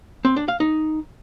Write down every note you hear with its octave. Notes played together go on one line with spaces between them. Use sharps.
C4
D4
F5
D#4